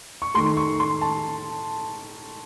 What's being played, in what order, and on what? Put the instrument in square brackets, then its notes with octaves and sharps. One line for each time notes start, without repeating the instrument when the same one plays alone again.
[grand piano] C#6
D#3 A3 C6
C#6
C6
A5